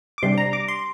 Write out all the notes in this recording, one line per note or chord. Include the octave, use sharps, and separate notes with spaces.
D6
C3 G3 D4 C6
A#5
D6
C6